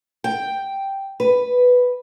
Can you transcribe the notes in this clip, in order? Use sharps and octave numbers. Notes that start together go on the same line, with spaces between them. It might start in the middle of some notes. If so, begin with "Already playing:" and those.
G5
B4